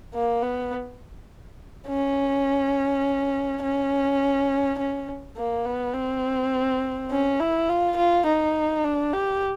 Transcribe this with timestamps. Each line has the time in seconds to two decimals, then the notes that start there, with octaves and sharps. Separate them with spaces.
0.14 A#3
0.42 B3
1.88 C#4
3.62 C#4
4.79 C#4
5.37 A#3
5.66 B3
5.94 C4
7.11 C#4
7.40 E4
7.69 F4
7.97 F4
8.26 D#4
8.84 D4
9.13 G4